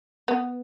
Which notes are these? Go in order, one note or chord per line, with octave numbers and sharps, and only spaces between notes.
B3